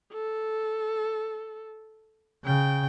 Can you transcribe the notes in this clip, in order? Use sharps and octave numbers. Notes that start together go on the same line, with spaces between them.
A4
C#3 G5